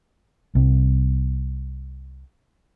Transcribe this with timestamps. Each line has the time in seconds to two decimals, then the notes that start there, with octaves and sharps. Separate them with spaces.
0.55 C2 C3